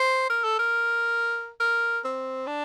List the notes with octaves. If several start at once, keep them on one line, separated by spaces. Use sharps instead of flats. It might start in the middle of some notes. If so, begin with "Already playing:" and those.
Already playing: C5
A#4
A4
A#4
A#4
C4
D4